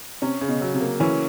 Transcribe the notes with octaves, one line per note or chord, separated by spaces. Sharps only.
C3 C#4
C#3
B2
F#3
C3
A#3
E3 C#4